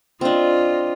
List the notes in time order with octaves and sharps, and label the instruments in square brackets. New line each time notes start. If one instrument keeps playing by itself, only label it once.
[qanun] C4 D4 [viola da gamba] F4 D#5